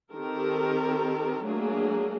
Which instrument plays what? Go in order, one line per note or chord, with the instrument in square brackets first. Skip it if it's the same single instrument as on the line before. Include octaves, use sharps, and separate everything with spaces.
[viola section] D#3 C4 G4 A4 A#4
F#3 A3 A#3 D4 G#4